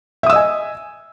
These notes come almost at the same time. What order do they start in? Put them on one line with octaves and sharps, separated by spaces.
E5 D#6 E6 D#5 G#5